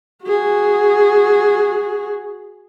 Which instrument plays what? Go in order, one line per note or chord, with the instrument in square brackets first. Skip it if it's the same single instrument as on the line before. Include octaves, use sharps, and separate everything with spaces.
[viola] F#4 G#4